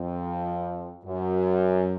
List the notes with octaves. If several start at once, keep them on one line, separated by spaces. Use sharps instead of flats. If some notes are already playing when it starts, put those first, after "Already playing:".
Already playing: F2
F#2